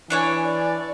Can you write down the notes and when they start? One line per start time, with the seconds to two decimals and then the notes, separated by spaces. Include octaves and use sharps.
0.10 E3 D4 C#5 G#5
0.43 D5